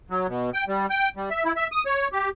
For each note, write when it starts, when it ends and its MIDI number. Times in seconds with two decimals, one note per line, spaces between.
0.10 0.27 54
0.28 0.50 47
0.54 0.64 79
0.68 0.86 55
0.90 1.09 79
1.16 1.29 55
1.30 1.44 76
1.45 1.52 64
1.56 1.67 76
1.72 1.84 87
1.86 2.08 73
2.13 2.29 67